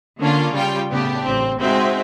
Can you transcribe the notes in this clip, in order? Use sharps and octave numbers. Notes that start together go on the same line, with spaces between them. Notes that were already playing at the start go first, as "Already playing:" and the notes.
D3 A#3 C#4 D4 F4
C#3 G3 F4 G5
A2 C#3 B3 D4 G4
A1 C4
G#3 C4 D#4 F#4 E5